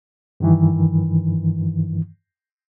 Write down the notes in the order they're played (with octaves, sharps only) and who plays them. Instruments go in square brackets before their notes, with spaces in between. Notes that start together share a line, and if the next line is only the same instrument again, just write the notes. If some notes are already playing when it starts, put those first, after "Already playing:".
[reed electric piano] G2 D#3 E3